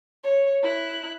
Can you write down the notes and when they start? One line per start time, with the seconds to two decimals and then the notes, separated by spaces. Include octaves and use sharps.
0.24 C#5
0.63 E4 F#6